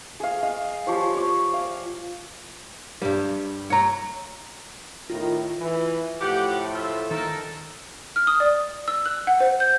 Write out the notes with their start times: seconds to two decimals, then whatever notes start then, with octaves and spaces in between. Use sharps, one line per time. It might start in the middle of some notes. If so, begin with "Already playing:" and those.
0.20 G#4 F5
0.43 D#5 F5
0.87 F3 G4 C#5
1.14 C#5 D5
1.54 F5
3.02 G2 G3
3.70 C#5 A#5
5.09 A2 D#3 F4 A#6
5.59 E3
6.21 A2 F3 A3 G4 F#5
6.73 F4 E5
7.11 D#3 D#4 A4 A#4
8.16 F6
8.27 D#6
8.40 D5
8.88 E6
9.06 F#6
9.27 F#5
9.40 C5
9.60 G6